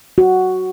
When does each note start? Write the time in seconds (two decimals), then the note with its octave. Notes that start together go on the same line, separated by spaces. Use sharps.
0.18 F#4